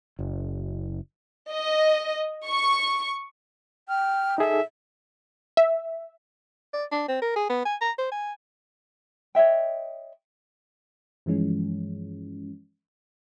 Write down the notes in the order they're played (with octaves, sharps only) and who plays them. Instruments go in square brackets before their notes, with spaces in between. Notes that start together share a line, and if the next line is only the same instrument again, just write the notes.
[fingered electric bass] F#1
[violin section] D#5
C#6
[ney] G5 [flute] F6
[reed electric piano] D#4 G#4 A4 [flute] E5
[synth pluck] E5
[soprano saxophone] D5
D4
C4
A#4
G#4
B3
G#5
A#5
C5
G#5
[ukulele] C#5 D#5 E5 G5
[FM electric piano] G2 E3 F3 G#3 C#4